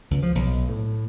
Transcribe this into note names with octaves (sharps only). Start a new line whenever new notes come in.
C#2
F3
B1
A2